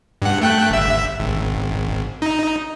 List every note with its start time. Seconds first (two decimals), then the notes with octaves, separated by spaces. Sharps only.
0.22 G2 F#5
0.41 A3 G5 F#6
0.70 G1 E5
1.20 G#1
2.22 D#4